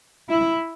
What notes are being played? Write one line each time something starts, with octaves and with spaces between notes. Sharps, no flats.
E4